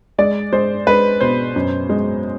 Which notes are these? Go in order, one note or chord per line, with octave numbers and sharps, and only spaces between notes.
G#3 D5
G#3 C5
G#3 B4
B2 C5
F#2
G#3